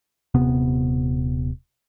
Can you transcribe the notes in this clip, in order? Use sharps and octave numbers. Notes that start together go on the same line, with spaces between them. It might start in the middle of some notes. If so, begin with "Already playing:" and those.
D#1 C3 B3